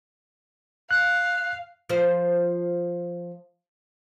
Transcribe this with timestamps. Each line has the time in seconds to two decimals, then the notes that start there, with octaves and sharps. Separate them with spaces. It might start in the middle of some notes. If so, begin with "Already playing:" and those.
0.91 F5 F#6
1.89 F3 C5